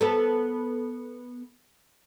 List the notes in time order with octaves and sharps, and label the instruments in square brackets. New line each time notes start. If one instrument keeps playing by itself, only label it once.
[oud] B3 A4